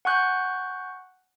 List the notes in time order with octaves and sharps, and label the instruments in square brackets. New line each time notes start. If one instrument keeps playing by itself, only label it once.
[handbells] F#5 G#5 C#6 F#6 G6